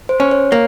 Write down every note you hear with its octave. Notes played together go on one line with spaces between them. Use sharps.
C5
C#4
C#5
A#3 C#5